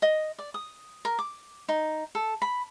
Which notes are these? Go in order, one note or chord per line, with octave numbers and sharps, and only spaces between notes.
D#5
D5
D#6
A#4
D6
D#4
A4
B5